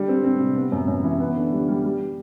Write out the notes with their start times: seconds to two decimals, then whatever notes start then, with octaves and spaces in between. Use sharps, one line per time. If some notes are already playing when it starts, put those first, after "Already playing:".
Already playing: D3 G3
0.08 C4
0.24 C4
0.40 C3
0.55 B3
0.72 F#2
0.88 F#2
1.04 E3
1.20 B3
1.36 D3
1.52 G3
1.68 G3
1.84 G3